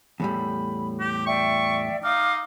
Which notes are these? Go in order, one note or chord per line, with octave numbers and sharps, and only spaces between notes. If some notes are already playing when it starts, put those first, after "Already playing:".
E2 A2 G3 B5
G4
D5 E5 G5 C#6
D#4 F5 D6 F6